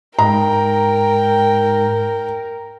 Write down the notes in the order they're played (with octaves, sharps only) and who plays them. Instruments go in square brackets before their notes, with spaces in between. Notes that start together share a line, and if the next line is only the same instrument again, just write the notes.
[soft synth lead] G#2 [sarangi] A#4 [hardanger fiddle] G5 [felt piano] A#5